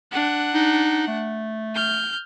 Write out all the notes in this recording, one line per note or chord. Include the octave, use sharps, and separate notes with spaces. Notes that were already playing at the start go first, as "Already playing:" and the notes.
D4 F#5
D#4
A3
F6 G6